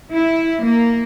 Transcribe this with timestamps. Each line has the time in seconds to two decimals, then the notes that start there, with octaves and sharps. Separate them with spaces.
0.12 E4
0.63 A#3